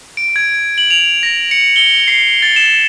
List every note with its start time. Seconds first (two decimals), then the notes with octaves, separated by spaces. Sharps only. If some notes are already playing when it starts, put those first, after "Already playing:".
0.17 D7
0.36 G#6
0.78 F#7
0.90 F7
1.23 A#6
1.51 C#7
1.76 G7
2.08 C7
2.43 A6
2.56 E7